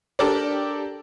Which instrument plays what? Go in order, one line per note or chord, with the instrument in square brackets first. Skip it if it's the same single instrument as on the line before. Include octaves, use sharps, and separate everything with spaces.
[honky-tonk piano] D4 G4 A4 A#4 D5